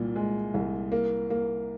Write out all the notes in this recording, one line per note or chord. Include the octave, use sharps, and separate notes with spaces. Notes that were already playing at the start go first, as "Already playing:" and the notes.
Already playing: C2 A#2
G#3
C2
A#3
A#3